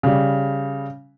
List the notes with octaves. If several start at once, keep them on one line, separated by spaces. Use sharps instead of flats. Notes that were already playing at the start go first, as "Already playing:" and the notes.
C#3 G3